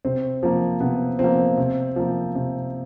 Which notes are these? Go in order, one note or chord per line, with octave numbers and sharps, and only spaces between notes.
C3 C4
F3 A#3
C3 B3
F3 A#3 C4
C3
F3 A#3
C3